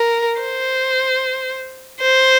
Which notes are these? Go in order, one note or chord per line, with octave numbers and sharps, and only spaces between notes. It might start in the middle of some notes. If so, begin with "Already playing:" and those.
Already playing: A#4
C5
C5